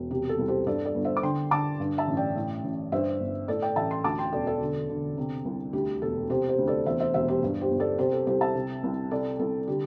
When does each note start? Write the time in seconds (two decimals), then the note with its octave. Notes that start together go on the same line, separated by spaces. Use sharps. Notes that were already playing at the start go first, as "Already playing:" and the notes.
Already playing: E1
0.11 C3 G4
0.29 A4
0.39 C2
0.48 G4 C5
0.67 G2 A4 D5
0.85 A4 D5
0.95 G1
1.04 C5 E5
1.17 D6
1.23 D3 G5 C6
1.51 D3 A5 D6
1.80 G2
1.98 E5 A5
2.08 A1
2.17 D5 G5
2.35 A2
2.64 A1
2.92 G2 C5 E5
3.20 G1
3.48 A2 A4 D5
3.62 D5 G5
3.76 A1 E5 A5
3.91 G5 C6
4.04 D2 A5 D6
4.19 G5 C6
4.33 E1 A4 D5
4.47 A4 D5
4.61 D3
4.89 D3
5.18 C3
5.45 C2
5.73 D2 G4
6.02 E1 A4
6.30 C3 G4 C5
6.48 G4 C5
6.58 D2
6.68 A4 D5
6.86 E2 C5 E5
7.00 C5 E5
7.14 E1 C5 E5
7.28 G4 C5
7.43 G2
7.61 G4 C5
7.71 G1
7.80 A4 D5
7.98 C3 G4 C5
8.13 A4
8.27 C2 G4 C5
8.41 E5 A5
8.55 C3
8.83 C2
9.11 C3 A4 D5
9.39 C2 A4
9.67 D3 G4